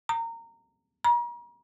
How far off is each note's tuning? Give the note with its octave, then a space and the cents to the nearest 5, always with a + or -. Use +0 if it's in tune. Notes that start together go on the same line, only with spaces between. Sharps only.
A#5 -20
A#5 +40